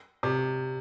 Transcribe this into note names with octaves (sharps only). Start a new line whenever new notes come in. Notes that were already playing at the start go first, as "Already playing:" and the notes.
C3